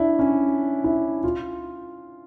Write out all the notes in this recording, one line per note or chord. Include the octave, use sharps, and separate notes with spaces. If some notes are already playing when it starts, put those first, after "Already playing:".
Already playing: D4 E4
C#4
E4
F4